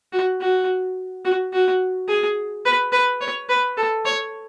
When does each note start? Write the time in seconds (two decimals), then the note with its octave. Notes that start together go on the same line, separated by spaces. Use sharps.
0.13 F#4
0.40 F#4
1.25 F#4
1.53 F#4
2.08 G#4
2.65 B4
2.92 B4
3.21 C#5
3.49 B4
3.77 A4
4.05 C#5